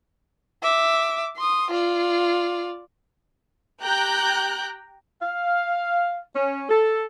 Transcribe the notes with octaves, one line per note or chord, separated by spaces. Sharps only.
E5 D6
C6 D#6
F4 D5
G4 G5 A#5 F#6 G6
F5
C#4
A4